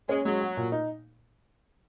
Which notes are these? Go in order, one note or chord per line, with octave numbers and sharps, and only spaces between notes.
G#3 C#4
F#3 G#3
F#4
A#2
D#4